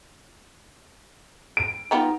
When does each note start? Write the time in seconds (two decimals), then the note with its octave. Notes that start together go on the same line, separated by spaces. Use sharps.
1.57 D7
1.91 G3 B3 D#4 F4